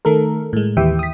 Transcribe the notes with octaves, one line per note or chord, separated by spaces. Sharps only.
D#3 A3 A4 A#4
A2 G#3
D#2 E3 G4 E5 G5
D#6 B6